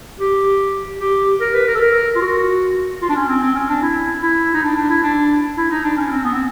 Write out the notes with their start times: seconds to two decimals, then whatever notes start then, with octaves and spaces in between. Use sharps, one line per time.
0.20 G4
1.00 G4
1.41 A#4
1.54 B4
1.67 A#4
1.75 A4
1.81 A#4
2.16 F4
2.21 F#4
3.02 F4
3.09 D4
3.15 C#4
3.29 C4
3.42 C4
3.55 C#4
3.69 D4
3.82 E4
4.22 E4
4.54 D#4
4.63 D4
4.77 D4
4.90 E4
5.03 D4
5.57 E4
5.71 D#4
5.84 D4
5.97 C#4
6.11 C4
6.24 B3
6.35 C4